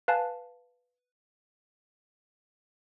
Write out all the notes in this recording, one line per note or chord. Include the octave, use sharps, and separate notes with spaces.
B4 F5 G#5 A5